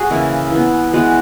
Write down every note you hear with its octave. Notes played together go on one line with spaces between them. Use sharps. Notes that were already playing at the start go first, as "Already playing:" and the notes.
Already playing: F#4 G#4
C#3 E3 A#3 E4
E3 B3
E3 G#3 B3 F#4